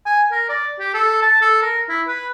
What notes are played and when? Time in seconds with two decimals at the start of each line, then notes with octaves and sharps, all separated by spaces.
0.06 G#5
0.32 A#4
0.49 D5
0.79 G4
0.94 A4
1.22 A5
1.41 A4
1.62 A#4
1.89 E4
2.08 B4